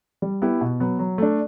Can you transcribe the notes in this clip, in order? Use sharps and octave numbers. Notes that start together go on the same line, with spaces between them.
G3
B3 E4 G4
B2
F#3 B3
F#3
A3 D4